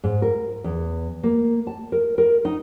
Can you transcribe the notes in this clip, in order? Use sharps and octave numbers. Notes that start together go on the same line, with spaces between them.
G#2
A#4
E2
A#3
A5
A#4
A#4
D#4